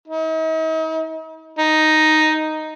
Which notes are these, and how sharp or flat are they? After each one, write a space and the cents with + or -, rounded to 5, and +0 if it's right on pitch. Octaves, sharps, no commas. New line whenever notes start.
D#4 +45
D#4 +0